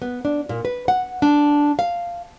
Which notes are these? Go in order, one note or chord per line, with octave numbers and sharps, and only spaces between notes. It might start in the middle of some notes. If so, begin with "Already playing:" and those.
B3
D4
A#2
B4
F#5
D4
F5